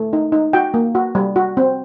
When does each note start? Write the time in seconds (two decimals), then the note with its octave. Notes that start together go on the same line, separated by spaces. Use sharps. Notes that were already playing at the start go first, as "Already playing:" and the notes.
Already playing: A3
0.13 D#4
0.32 D#4
0.53 F#4 G5
0.74 A#3
0.95 F#4
1.15 G3
1.36 F#4
1.57 C4